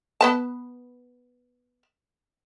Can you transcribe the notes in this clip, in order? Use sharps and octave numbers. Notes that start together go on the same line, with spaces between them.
B3 B4 A5